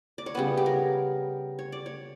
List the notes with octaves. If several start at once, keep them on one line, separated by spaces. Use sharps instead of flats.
D5
C#5
C#3 G3 B3 B4
G4
A#4
C#5
D5
C#5